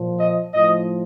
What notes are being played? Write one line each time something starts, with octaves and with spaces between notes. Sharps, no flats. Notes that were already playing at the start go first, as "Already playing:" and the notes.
Already playing: A#2 F3
D#5
A2 F3 D#5